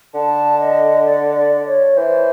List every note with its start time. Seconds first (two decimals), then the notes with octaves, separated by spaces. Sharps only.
0.14 D3 A5
0.60 D#5
1.06 D5
1.36 D5
1.67 C#5
1.97 E3 C5